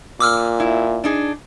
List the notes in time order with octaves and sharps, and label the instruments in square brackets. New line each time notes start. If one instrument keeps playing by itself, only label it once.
[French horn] A#2 [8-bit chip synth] D6 E6 F6
[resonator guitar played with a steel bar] E4
D4 D#4 G#4